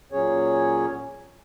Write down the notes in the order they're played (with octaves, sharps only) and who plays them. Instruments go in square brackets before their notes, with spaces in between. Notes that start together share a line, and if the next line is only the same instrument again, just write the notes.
[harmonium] A#2 F#3 C#4 G#4 C#5